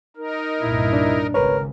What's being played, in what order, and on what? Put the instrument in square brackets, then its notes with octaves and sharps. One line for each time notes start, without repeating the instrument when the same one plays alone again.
[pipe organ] D#4 A#4
[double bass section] C2 G2 A#2 [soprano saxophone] E4
[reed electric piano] D4
[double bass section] G#1 C#2 C#3 [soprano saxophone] A#4 [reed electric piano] B4 C#5